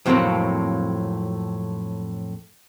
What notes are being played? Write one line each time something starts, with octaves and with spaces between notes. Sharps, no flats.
F2 A2 C3 F#3 A#3 C4